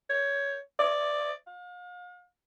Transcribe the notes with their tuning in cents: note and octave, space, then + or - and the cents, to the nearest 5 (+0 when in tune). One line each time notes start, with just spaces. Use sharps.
C#5 +15
D5 +5
F5 +40